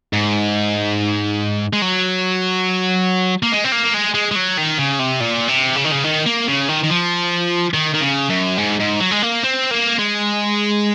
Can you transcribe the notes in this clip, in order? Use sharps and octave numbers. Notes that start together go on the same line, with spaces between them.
G#2
G#3
F#3
A#3
G#3
C4
A#3
G#3
G#3
G#3
F#3
D#3
C#3
C3
A#2
C3
C#3
D#3
C#3
D#3
A#3
C#3
D#3
D#3
F3
D#3
D#3
C#3
F#2
G#2
G#2
F#3
G#3
A#3
C4
A#3
G#3